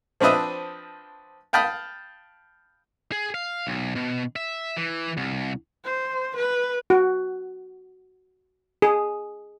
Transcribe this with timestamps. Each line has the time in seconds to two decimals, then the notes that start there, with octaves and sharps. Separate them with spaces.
0.20 F3 C4 D4 B4 D#5 E5
1.53 F5 G5 A5 B5 D#6 F6
3.12 G#4
3.34 F5
3.67 B1
3.96 B2
4.36 E5
4.77 E3
5.17 C2
5.84 C5
6.36 B4
6.90 F#4
8.82 G#4